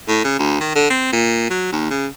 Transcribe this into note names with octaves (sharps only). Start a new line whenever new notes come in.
A2
C#3
D2
D#3
D3
C4
A#2
F#3
D#2
C#3